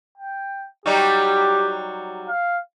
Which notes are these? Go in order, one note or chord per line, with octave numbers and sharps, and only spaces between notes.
G5
F#3 G3 D#4 G4
F5